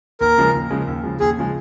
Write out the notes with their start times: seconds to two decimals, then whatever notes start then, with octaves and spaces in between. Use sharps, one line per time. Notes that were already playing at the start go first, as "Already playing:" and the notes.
0.21 D#2 A#4
0.37 C#3 F3 G#3
0.54 D#2
0.70 C#3 F3 G#3
0.87 D#2
1.03 C#3 F3 G#3
1.20 D#2 G#4
1.37 C#3 F3 G#3